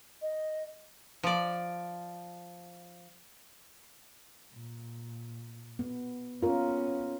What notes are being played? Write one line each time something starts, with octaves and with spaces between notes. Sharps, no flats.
D#5
F3 D5
A#2
B3
B3 C#4 F4 A#4